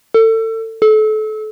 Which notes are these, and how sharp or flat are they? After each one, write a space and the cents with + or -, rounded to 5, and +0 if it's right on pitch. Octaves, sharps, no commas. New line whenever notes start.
A4 +30
A4 -30